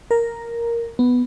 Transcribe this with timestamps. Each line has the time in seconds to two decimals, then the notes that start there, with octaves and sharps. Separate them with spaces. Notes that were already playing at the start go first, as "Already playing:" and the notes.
0.11 A#4
0.99 B3